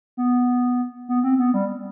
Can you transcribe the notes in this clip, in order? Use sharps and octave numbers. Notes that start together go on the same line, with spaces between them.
B3
B3
C4
B3
G3